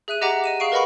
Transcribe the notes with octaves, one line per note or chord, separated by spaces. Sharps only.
G#4 E5 F#6 D#7
G4 D#5 E5 F#5 A#5 D6
D#5 D#7 E7
G#4 F5 C#6 C7 D7
A#4 B4 D#5 F#5 B5 C#6